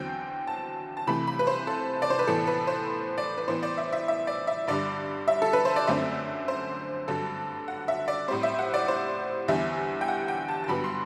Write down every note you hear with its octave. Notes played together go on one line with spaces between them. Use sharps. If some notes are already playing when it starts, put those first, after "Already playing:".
Already playing: E2 D3 F#3 C4 G5
A5
A5
C3 E3 A3 B5
B5
B4
C5
A4
D5
C5
B4
A2 E3 B3 A4
B4
C5
D5
B4
A2 E3 B3 C5
D5
E5
E5
E5
D5
E5
G2 D3 G3 D5
E5
A4
B4
C5
D5
F#2 D3 A3 C4 E5
C5
G2 D3 F#3 A4
F#5
E5
D5
A2 G3 C4 C5
E5
F#5
D5
C5
E2 D3 G3 E5
G5
F#5
G5
A5
A5
G2 D3 F#3 B3 B5
C6